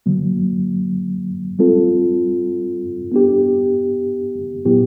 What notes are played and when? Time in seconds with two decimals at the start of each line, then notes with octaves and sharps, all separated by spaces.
0.06 D3 F#3 A#3
1.59 G3 C4 F4 A4
3.12 B3 D4 G4
4.65 A#2 F#3 B3 E4 G4